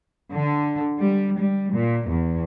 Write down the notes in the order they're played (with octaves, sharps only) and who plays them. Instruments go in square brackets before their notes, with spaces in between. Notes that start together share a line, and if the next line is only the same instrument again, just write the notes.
[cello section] D3
G3
G3
A#2
E2